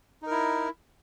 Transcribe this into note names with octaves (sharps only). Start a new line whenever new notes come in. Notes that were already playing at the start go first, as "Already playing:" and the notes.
D#4 E4 A#4